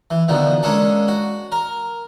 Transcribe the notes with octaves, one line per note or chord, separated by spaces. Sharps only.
E3
B2 D3 D#3 F3
G#3 A#3 C#4 D4 A4
F#4
A#4